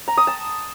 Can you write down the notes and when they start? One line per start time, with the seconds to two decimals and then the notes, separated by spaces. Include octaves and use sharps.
0.08 A#5
0.17 D#6
0.27 A5